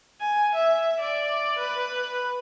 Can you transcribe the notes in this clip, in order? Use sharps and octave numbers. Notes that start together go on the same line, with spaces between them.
G#5
E5
D5
B4